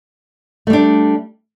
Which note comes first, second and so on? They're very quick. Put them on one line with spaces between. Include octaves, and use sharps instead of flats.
A3 G3 D4